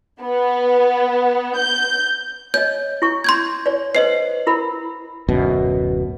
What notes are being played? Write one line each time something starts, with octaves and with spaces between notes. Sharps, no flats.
B3
G6
C#5 D#5 G6
E4 C#6
C6 G6 G#6
C#5 D5
B4 C5 D#5 C7
E4 A#4 B5
D1 F#2 B2